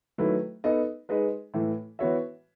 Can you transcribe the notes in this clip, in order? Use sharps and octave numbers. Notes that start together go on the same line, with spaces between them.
D#3 F#3 A3 E4 B4
B3 D#4 A4 D#5
G#3 D#4 G#4 B4 D#5
A2 E3 A3
E3 B3 F#4 C#5 E5